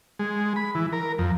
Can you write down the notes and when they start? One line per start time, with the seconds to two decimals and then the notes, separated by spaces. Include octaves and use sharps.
0.19 G#3
0.56 B5
0.75 E3
0.93 A#4
1.18 F2